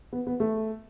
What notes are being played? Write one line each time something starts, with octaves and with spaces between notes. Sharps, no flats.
B3
B3
A3